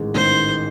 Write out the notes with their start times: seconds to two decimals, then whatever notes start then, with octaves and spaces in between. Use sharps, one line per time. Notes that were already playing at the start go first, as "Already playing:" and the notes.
Already playing: A1 G#2 D#3 G#3
0.14 A1 G#2 D#3 G#3 C5